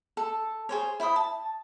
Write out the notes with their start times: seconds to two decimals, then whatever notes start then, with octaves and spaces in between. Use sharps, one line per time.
0.17 A4
0.69 G#4 C5 C#5
1.00 E4 C5 B5 D#6
1.16 A5